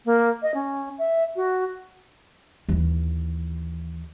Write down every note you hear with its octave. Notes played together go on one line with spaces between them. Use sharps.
A#3
D#5
C#4
E5
F#4
D#2 E3